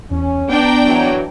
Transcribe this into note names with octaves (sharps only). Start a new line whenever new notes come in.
E2 C#4
B3 D4 G5 A#5
E3 F#3